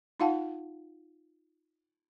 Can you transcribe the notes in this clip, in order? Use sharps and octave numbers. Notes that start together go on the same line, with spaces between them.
D#4 F4 F5 F#5 A5